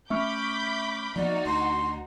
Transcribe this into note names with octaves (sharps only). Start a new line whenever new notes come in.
A3 C#4 E5 B5 C#6 D6 F6 G6
F3 A#3 B3 D#4 F#4 D5
D2 C6